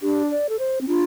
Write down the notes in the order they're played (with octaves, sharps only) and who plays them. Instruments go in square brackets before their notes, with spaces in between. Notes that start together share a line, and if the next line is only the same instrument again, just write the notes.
[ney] D4 [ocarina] G4
[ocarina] D5
A4
C5
C4
[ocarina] D4 [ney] F4